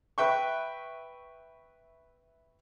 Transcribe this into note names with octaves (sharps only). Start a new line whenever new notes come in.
B4 E5 G5 C#6